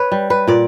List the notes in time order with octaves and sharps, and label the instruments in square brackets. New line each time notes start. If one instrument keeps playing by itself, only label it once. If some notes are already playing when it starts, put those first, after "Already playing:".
Already playing: [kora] B4 C#5
G3
B4
A#2 D5